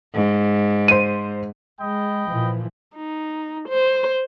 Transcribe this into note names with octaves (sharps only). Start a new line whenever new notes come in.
G#2
C5 D#7
G#3 D#5 G5 B5
A#2 E3 F3
D#4
C5